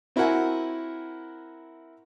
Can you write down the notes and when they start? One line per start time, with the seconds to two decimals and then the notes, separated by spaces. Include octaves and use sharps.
0.16 C4 E4 F#4 A#4 F#5 G#5